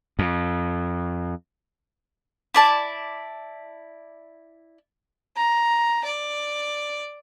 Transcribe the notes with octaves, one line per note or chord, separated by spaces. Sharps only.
F2
E4 D5 A5
A#5
D5